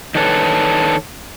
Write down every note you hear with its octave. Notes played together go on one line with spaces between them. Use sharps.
D#3 D4 A4 B4 C#5